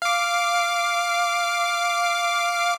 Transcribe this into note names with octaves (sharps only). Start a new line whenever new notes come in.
F5 D6